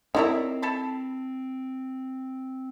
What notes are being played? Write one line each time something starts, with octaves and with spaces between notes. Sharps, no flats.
C4 C#4 D#4 E4 A#4 C#5 D5 E5
A4 A5 B5